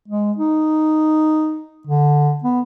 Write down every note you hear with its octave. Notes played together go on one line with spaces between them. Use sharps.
G#3
D#4
D3
B3